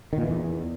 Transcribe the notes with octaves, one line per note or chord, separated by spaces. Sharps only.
D#3
A#2
E3
E2